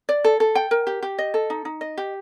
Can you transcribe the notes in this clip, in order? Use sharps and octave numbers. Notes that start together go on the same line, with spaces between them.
D5
A4
A4
G5
A#4
G4
G4
D#5
A4
D#4
D#4
D#5
G4